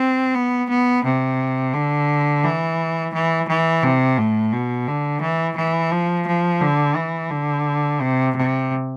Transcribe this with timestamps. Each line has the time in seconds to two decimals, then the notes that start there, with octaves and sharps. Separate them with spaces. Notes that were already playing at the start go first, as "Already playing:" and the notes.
Already playing: C4
0.35 B3
0.69 B3
1.04 C3
1.74 D3
2.44 E3
3.14 E3
3.48 E3
3.83 C3
4.18 A2
4.53 B2
4.87 D3
5.22 E3
5.57 E3
5.92 F3
6.27 F3
6.61 D3
6.96 E3
7.31 D3
8.01 C3
8.36 C3